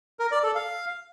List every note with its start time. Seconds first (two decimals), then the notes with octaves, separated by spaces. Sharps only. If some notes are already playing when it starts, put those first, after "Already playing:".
0.19 A#4
0.31 D5
0.43 A4
0.55 F5